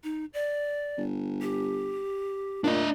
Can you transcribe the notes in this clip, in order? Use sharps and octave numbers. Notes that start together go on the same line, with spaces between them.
D#4
D5
G1
G4
A#2 A3 D4 D#5